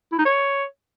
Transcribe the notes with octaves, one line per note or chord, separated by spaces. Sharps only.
E4
D#4
C#5